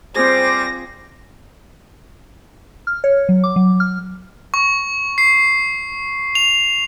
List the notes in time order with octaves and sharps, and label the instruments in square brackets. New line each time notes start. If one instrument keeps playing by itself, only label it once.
[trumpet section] G3 D6 [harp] C4 F4 G#4 [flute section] C5 [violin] A#6
[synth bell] F6
C#5
F#3
D6
F#3
F6
[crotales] C#6
C7
F7